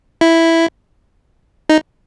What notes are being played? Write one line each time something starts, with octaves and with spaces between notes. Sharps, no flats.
E4
D#4